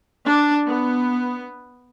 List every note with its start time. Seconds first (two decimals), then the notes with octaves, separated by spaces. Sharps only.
0.25 D4
0.67 B3